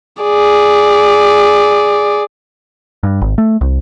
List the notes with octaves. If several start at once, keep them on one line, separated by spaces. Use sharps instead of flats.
G#4 D5
G2
G#1
A3
C2